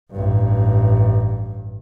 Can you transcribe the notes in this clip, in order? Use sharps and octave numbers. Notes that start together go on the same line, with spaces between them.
A1 G2